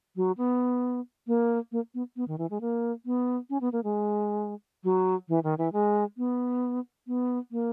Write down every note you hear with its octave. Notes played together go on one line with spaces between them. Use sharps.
F#3
B3
A#3
A#3
B3
B3
D#3
E3
G#3
A#3
B3
C#4
B3
A#3
G#3
F#3
E3
D#3
E3
G#3
B3
B3
A#3